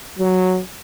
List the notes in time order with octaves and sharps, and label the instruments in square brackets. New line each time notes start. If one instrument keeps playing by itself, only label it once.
[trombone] F#3